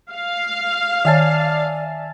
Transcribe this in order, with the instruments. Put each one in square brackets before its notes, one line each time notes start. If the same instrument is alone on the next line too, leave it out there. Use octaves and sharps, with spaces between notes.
[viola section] F5
[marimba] D#3 C#5 [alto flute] D5 [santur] E5 G#5 A5